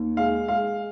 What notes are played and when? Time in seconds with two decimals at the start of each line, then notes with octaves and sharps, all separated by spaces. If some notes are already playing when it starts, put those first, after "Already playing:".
Already playing: D#2
0.17 G#3 F5
0.48 G#3 F5